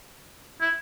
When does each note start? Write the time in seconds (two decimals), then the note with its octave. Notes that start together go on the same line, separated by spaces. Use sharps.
0.61 E4